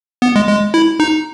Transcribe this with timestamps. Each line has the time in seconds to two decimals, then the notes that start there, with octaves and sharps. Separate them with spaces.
0.22 B3
0.36 G#3
0.48 G#3
0.74 E4
1.00 D#4